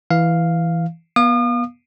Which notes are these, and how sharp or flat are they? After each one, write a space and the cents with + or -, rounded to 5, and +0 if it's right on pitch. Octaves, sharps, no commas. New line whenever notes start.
E3 +0 F5 +0
B3 -30 F5 +0 D#6 -40